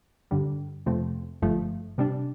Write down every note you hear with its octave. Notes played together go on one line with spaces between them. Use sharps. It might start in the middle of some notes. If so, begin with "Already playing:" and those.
G2 D3 G3
F2 C3 F3 A3 C4
G1 G2 F3 A3
C3 G3 D4